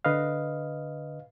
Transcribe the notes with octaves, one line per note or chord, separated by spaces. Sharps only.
D3 B4 D#5 F5